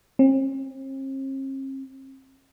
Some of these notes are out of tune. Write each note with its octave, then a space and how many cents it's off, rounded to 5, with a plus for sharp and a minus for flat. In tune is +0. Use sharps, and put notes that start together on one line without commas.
C4 +45